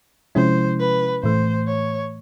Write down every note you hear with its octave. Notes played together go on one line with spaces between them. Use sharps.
C3 F3 G#3 C#4 E4 C5
B4
A2 E3 A3 C5
C#5